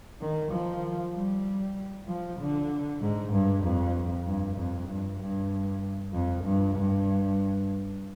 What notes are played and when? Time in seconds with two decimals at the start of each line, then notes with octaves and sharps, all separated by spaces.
0.21 D#3
0.52 F3
1.14 G3
2.08 F3
2.40 D3
3.02 G#2
3.33 G2
3.64 F2
4.26 G2
4.57 F2
4.88 G2
5.20 G2
6.13 F2
6.44 G2
6.76 G2